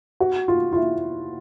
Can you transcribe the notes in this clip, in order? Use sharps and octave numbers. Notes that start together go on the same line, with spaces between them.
F#4
F4
F4
E4